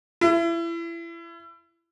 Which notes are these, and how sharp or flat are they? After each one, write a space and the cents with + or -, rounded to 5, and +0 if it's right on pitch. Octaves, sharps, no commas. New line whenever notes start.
E4 +30